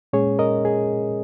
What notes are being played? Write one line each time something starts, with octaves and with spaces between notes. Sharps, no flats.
A#2 G#3 C#4 G#4 C#5
A#4 D#5
G#4